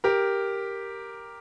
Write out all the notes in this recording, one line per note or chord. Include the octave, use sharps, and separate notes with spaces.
G4 A#4